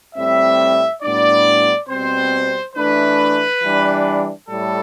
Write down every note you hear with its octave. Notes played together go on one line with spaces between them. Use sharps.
A2 G3 C4 E5
A2 G3 B3 D4 D5
B2 G3 C4 C5
E3 A3 D4 B4
E3 G3 D4
A2 G3 A4